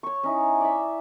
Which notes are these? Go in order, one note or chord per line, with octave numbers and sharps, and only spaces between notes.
C#5 C#6
C#4 D#4 E4
D5 E5